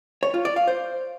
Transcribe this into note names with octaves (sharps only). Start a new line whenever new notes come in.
C#5
F4
D5
F5
C5